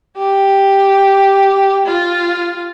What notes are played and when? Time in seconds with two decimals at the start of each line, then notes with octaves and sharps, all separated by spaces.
0.18 G4
1.86 F4